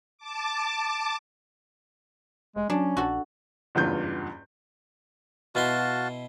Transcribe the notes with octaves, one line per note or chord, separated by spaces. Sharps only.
A5 D6
F1 G#3
F#3 C#4 D4
A#1 F#4 A4
F#1 E2 G2 F4 G6
B2 E4 F#4 F5 A5 C6